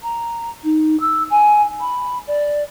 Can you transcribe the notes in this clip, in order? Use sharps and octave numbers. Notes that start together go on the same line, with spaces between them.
A#5
D#4
E6
G#5
B5
D5